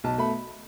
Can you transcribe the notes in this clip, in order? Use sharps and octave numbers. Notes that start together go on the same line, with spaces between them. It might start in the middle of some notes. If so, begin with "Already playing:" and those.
B1 A5
B2 A3 B5